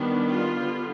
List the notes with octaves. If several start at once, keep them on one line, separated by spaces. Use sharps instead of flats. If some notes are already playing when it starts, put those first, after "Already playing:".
Already playing: D#3 G3 B3 D4
F4
D3 G3 B3